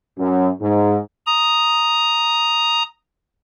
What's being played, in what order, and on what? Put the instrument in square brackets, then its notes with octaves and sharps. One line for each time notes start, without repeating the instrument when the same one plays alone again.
[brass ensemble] F#2
G#2
[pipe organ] A#5 D#6